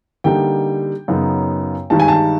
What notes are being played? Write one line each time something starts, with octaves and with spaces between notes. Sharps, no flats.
D3 G3 A#3 D#4 G5
F#2 C#3 F#3 B3 D#4
G2 D#3 G#3 A5
G#5
A5